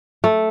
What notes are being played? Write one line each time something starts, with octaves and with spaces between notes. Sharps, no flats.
A3